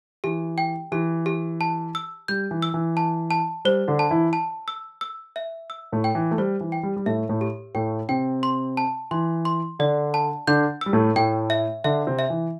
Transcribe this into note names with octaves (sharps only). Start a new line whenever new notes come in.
E3 G4
G5
E3 G4
G4
A5
E6
G3 G6
E3
E6
E3
A5
A5
G3 C5
D3 D4
A5
E3 E4
A5
E6
E6
E5
E6
A2 A3
G5
E3
A3
G3 C5
E3
G5
G3
G3
A2 A3 E5
A2 A3
G4
A2 A3 G5
C3 C4 G5
C6
A5
E3 C6
C6
D3 D4 D5
A5
D3 D4 G6
G3 E6
A2 A3
A2 A3 G5
E5
D3 D4 E5
C3 C4
E5
E3